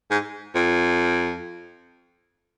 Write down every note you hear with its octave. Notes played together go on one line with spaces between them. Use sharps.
G#2
F2